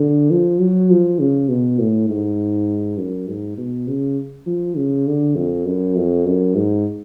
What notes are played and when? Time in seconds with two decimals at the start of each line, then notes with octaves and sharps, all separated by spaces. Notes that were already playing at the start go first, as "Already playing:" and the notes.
Already playing: D3
0.31 F3
0.60 F#3
0.90 F3
1.19 C#3
1.49 B2
1.79 A2
2.09 G#2
2.98 F#2
3.28 G#2
3.57 B2
3.88 C#3
4.46 F3
4.77 C#3
5.07 D3
5.36 F2
5.65 F#2
5.96 F2
6.26 F#2
6.55 G#2